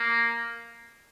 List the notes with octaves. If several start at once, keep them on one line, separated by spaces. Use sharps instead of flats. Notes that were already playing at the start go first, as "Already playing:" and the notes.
Already playing: A#3